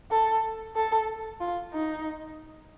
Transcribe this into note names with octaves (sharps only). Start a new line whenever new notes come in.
A4
A4
F4
D#4